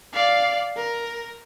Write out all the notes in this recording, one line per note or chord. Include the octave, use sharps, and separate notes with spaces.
D5 F5
A#4